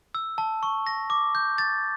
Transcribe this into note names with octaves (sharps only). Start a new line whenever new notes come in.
E6
A5
C#6
A#6
D6
G6
A6